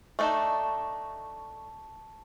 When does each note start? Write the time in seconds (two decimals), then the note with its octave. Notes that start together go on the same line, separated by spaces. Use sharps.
0.19 A3 D4 D#4 A5 C#6